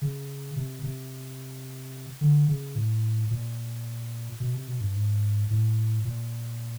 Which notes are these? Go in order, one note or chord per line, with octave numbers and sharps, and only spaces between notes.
C#3
C3
C3
D3
C#3
A2
A#2
B2
C3
B2
G2
G#2
A2
A#2